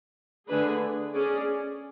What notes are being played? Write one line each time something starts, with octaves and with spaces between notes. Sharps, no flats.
D3 A3 D4 G#4 B4
C#4 G#4 D5